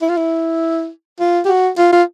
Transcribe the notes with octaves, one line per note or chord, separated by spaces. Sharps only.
E4
F4
E4
F4
G4
F#4
F4
F4